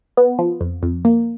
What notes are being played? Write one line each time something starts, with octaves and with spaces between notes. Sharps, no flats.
B3
F3
F2
F2
A#3